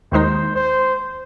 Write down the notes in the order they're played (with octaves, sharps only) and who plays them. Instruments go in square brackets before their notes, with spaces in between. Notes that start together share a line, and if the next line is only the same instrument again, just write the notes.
[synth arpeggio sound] D#2 D#3 G#3 D#4 [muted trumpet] C5
[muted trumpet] C5